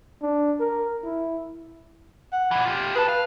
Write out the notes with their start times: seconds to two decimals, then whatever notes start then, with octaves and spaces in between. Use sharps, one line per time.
0.22 D4
0.60 A#4
1.04 E4
2.32 F#5
2.51 A#2 E3
2.65 F4 G4
2.95 G#4 B4 A5
3.08 F5